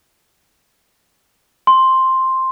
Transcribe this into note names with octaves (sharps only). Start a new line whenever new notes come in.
C6